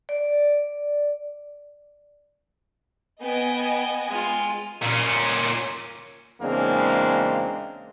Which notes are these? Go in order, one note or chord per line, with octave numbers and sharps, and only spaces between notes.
D5
B3 D#5 G5 G#5
G#3 F4
A#2 C#4
E2 C#3 G#3 A#3 C4 D4